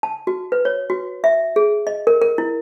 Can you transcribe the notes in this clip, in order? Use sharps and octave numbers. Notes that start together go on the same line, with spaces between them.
A5
F#4
B4
C#5
F#4
E5
G#4
D#5
A#4
A#4
E4